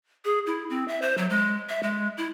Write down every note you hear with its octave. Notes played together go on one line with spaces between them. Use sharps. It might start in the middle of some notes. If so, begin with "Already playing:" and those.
G#4
E4
C4
E5
C5
F#3
G#3
E5
G#3
E4